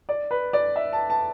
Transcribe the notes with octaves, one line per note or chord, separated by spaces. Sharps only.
D5
B4
D5
E5
A5
A5